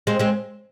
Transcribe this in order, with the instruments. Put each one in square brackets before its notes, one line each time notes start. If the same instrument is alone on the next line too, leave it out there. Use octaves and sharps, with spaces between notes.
[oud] G#3 C4
G#3 C4